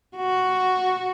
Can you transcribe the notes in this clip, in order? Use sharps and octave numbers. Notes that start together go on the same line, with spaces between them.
F#4